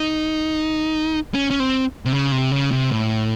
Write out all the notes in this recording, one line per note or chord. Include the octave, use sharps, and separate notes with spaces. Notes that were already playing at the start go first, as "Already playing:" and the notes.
Already playing: D#4
C#4
C#4
C4
C3
C#3
C3
C#3
C3
A2